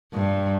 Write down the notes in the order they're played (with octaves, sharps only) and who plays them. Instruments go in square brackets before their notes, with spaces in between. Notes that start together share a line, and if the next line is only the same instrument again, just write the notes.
[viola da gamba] G2